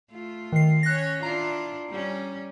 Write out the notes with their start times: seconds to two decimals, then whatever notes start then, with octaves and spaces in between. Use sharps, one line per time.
0.11 A3 F4
0.52 D#3 C7
0.83 C#4 C#5 F#6 A#6
1.23 D4 E4 F4 A#5
1.89 G3 C#4